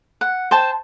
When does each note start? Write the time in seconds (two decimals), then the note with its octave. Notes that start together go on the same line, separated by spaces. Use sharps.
0.21 F#5
0.51 C5 G5 A5